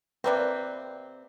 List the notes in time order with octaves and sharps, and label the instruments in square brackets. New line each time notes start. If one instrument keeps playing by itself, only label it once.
[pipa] C3 A#3 C4 [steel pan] B4 D5